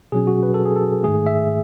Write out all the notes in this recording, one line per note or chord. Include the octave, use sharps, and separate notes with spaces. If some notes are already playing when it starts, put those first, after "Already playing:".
B2 F#3 C#4 G#4
F#4
B4
A4
G#4
A4
G#2 D#3 A3 G#4
E5